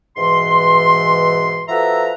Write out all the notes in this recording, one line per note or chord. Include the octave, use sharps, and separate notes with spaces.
G#2 B2 E3 E5 C6
F3 F#4 A4 B4 E5 A#5